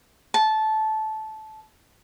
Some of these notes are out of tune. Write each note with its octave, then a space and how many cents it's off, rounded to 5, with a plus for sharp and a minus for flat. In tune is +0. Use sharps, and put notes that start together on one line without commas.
A5 -15